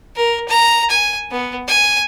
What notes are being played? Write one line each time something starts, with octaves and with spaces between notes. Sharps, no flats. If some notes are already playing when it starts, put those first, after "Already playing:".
A#4
A#5
G#5
B3
G#5